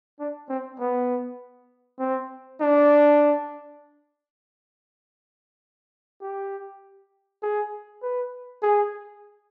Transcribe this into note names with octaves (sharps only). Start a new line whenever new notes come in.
D4
C4
B3
C4
D4
G4
G#4
B4
G#4